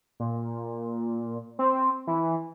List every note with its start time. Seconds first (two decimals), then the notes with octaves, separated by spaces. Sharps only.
0.20 A#2
1.59 C4
2.07 E3